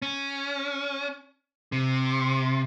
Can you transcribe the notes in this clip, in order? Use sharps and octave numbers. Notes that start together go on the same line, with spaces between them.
C#4
C3